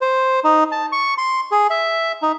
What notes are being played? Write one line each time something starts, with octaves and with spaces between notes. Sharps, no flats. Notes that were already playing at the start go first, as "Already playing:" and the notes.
C5
D#4
A5
C#6
C6
G#4
E5
D#4